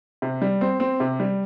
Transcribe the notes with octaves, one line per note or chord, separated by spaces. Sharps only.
C3
G3
C4
C4
C3
G3